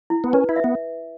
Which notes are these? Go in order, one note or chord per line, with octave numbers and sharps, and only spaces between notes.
E4
B3
C#4 B4
E4
E5
B3